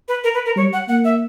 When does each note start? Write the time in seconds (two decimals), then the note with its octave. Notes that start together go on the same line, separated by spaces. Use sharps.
0.08 B4
0.24 A#4
0.34 B4
0.46 A#4
0.56 G3 C#5
0.73 F#5
0.88 A#3 F#5
1.05 E5